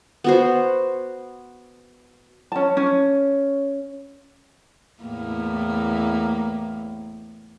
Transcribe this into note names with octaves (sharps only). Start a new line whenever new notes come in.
B3 F#4 C5
C#4 A5
C#4
E2 A2 A#3